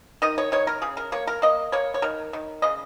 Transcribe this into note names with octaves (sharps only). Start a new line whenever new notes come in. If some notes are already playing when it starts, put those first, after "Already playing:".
D#3 D#5
C#5
D#3 C#5
A#4
C#3 G#4
A#4
A#3 C#5
A#4
A#3 D#5
A#3 C#5
C#5
D#3 A#4
D#3
C#3 D#5